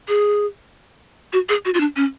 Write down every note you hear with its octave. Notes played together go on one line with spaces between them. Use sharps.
G#4
F#4
G#4
F#4
F4
D4
C#4